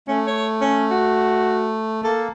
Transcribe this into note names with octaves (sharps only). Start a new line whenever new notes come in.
A3 C#4
C#5
C#4
F#4
A#3 A4